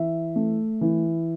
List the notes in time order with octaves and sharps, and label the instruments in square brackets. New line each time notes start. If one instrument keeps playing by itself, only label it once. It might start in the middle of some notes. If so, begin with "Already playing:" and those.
Already playing: [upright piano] E3 E5
A3
E3